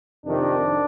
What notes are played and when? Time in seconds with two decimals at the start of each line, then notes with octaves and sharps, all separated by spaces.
0.25 F2 C3 D#3 D4